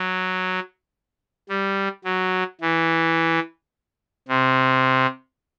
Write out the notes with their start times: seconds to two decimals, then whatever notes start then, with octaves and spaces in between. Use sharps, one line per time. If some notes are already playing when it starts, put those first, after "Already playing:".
Already playing: F#3
1.49 G3
2.04 F#3
2.61 E3
4.28 C3